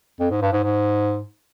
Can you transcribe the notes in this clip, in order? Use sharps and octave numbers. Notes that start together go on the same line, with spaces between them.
F2
G#2
G2
G#2
G#2